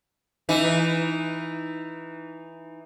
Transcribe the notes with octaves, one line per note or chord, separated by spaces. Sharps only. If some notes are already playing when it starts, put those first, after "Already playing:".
E3 D#4